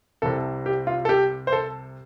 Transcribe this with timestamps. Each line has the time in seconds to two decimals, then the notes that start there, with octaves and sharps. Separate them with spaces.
0.22 C2 C3 A4
0.66 G4
0.87 F4
1.05 A4
1.09 G4
1.47 C5
1.53 A4